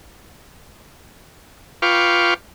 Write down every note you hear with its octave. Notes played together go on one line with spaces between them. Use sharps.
F4 B4 F5 G5 C#6 D6